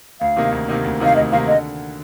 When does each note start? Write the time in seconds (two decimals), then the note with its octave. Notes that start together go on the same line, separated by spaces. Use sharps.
0.21 D2 F5
0.36 C3 D#3 A#3 D#4
0.52 D2
0.68 C3 D#3 A#3 D#4
0.84 D2
1.00 C3 D#3 A#3 D#4 F5
1.16 D2 D#5
1.32 C3 D#3 A#3 D#4 F5
1.48 D3 D#5